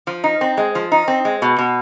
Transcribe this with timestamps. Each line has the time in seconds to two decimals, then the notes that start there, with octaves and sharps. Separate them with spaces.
0.07 F3
0.24 D#4
0.41 C4
0.57 G#3
0.75 F3
0.92 D#4
1.08 C4
1.25 G#3
1.42 B2
1.59 B2